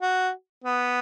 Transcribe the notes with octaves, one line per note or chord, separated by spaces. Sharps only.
F#4
B3